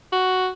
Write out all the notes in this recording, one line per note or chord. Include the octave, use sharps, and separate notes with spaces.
F#4